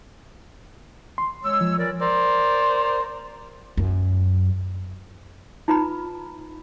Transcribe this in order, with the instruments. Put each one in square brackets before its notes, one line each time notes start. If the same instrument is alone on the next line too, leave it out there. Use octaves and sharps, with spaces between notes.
[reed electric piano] C6
[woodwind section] G#3 C#5 E6
[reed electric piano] F3
[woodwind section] E3 A#4 D5
[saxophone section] A#4 C5 D5
[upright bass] F#2
[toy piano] D#4 F4 B4 A#5 B5